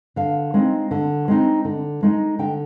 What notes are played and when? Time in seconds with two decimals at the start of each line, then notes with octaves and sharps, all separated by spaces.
0.16 D3 F5
0.54 G#3 C4 D#4
0.91 D3
1.28 G#3 C4 D#4
1.65 D3
2.03 G#3 D#4
2.39 D3 G5